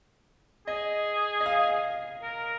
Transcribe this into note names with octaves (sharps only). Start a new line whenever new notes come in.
G#4 D#5
D#5
F5
A#4